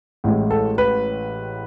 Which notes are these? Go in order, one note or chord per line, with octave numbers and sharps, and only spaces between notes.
A1 A2 G#3
A4
B4